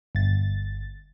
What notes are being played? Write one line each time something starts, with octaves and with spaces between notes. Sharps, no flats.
G1 A6